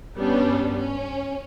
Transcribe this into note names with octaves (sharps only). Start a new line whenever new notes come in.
G2 G3 B3 C#4 D4
C#4